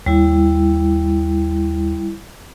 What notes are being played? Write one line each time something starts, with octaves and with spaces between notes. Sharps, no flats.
D#2 G3 E4